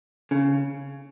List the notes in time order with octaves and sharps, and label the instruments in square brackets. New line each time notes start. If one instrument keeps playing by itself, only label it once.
[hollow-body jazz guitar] C#3